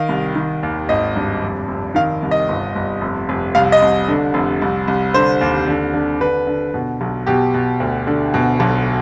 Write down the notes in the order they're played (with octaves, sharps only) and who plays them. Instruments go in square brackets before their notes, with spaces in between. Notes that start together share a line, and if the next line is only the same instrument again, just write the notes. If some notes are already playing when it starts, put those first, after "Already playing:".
Already playing: [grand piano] D#3 F5
C2
D#3
D#2
G#1 D#5
G2
F1
F1
D#3 F5
C2
D#5
G1
G1
F1
F1
C2 F5
D#5
C2
D3
F1
C2
C2
D3 C5
D#2
D3
D3
D3 B4
D3
B2
B1
B2 G4
B2
D2
D3
B2
B1